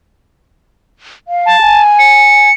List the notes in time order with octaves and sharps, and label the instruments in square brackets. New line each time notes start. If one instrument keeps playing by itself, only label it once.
[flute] F5
[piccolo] A5
[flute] G#5
[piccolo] C#7